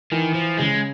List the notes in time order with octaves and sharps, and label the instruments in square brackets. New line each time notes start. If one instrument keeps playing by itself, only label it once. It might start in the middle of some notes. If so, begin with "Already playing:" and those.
[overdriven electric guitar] D#3 [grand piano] E3
[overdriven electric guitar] F3
[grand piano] C#3 [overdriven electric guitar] G#3